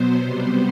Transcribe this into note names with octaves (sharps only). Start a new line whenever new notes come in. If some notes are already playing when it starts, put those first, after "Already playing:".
Already playing: B2 F#3 B3 C5
C3 G3 B3 C5